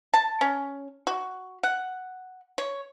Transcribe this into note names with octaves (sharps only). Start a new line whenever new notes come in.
A5
C#4
F#4
F#5
C#5